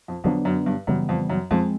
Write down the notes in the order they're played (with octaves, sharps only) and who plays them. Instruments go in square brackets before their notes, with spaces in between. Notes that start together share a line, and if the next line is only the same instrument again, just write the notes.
[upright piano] F2
[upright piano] F2 [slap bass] D3 F#3 B3 D4
[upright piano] F#2
G2
[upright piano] F#2 [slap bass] C#3 E3 G3 B3
[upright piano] F2
F#2
[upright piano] F2 [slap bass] F3 G#3 C4